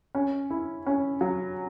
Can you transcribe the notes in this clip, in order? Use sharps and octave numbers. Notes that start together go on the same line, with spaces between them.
C#4
E4
C#4
F#3